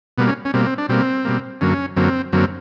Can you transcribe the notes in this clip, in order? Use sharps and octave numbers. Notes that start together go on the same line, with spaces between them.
B2 G3 A#3 B3
C#4
C#4
B2 G3 A#3 C4
C4
D4
B2 G3 A#3 C4
B2 G3 A#3
F#2 D3 F#3 A#3 C#4
F#2 D3 F#3 A#3 C4
F#2 D3 F#3 A#3 C4